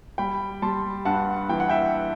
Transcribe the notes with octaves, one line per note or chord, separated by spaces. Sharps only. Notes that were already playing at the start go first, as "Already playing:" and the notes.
G3 G5 B5
G3 A5 C6
G2 F#5 A5
E3 G5
F#5
E5 G5